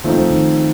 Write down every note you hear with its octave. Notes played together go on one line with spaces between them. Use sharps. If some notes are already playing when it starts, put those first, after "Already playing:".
D#3 F3 A3 C4 D#4
E3
D#3